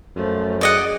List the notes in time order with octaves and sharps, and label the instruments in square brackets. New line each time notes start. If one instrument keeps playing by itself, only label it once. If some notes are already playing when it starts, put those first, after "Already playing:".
[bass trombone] F#2 [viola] F3 A3
[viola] G#4 [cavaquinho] D5 D#5 F#5